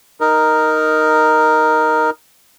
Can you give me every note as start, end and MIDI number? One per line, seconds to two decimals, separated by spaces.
0.21 2.10 63
0.21 2.10 70